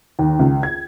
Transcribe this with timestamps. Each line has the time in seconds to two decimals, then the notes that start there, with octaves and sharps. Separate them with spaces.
0.19 D#2
0.39 C#2
0.63 G#6